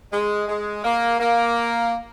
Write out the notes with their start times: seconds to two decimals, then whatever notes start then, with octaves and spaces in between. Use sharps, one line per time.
0.13 G#3
0.48 G#3
0.84 A#3
1.20 A#3